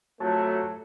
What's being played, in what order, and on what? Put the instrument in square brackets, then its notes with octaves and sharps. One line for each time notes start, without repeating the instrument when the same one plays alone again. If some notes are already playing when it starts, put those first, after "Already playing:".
[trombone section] C3 F#3 A3 [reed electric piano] F4 C#5 A5 [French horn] A4